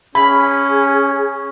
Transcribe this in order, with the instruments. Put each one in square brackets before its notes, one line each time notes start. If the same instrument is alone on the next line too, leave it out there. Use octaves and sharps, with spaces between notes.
[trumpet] C#4 [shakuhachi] G#4 [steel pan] B5